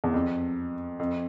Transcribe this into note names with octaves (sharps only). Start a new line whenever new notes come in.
E2
F2
F2